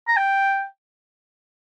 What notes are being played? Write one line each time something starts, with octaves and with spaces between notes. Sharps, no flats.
A#5
G5